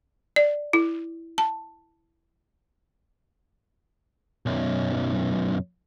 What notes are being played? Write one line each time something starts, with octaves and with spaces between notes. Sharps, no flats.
D5
E4
A5
B1 F#2